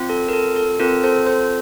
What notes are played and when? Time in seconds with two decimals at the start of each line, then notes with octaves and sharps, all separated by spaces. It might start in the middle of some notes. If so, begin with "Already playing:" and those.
Already playing: C4 F4
0.09 A4
0.28 A#4
0.33 A4
0.56 A4
0.80 C4 F4 A4 A#4
1.03 A4 C5
1.26 A4 C5